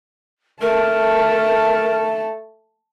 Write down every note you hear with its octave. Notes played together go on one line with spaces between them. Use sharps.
A3 A#4 A5